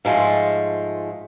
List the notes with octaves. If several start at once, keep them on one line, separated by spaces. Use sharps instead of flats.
G#2 F3 G#3 A3